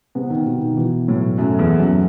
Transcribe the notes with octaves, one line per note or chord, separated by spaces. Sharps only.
C3 B3
D#3
B2 D#3
D#3
B2 E3
A2 F#3
F#2 A3
E2
D#2
F#2